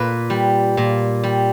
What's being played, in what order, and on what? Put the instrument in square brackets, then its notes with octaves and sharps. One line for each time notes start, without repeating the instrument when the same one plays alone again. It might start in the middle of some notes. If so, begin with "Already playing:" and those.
Already playing: [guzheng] A#2 B4
G3
A#2
G3